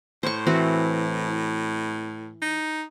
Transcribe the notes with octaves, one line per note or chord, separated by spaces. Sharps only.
A2 C5 C#6
E3 C4 F#4
D#4